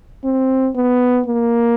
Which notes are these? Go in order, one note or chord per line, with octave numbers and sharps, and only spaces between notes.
C4
B3
A#3